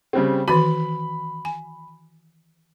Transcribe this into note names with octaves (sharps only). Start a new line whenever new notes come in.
C#3 G3 C4
D#3 E3 F#4 B5
G#5